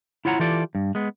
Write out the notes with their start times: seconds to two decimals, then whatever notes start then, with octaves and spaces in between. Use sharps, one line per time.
0.25 E4 F4 C#5 F#5 G5 A#5
0.39 E3 F4 G4 A4 D5
0.75 G2
0.95 G#3 B3